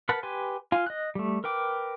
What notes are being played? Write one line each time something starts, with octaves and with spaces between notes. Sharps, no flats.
A#4 B4 F#5 A5 B5
G4 B4 G#5 C6
F4 F5 G#5
D#5 F#6
G3 A3
A#4 B4 G5 D6